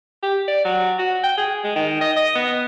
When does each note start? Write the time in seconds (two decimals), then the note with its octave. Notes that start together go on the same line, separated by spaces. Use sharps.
0.23 G4
0.48 D5
0.65 F#3
0.99 F#4
1.24 G5
1.37 G#4
1.64 G#3
1.76 D#3
2.01 D#5
2.17 D#5
2.35 B3